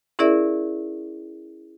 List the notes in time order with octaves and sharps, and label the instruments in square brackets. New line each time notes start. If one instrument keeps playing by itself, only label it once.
[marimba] C#4 E4 G#4 A#4 D5 E5